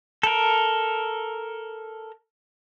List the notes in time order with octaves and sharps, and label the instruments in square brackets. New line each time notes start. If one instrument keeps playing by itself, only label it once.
[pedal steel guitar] A4 A#4